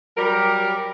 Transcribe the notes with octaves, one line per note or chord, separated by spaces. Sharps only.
F#3 G3 G4 A#4